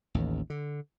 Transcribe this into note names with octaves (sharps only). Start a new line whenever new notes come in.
A1 D#2
D3